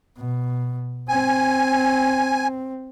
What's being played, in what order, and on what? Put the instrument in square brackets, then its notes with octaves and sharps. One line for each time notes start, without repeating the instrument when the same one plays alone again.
[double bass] B2
[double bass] C4 [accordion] G#5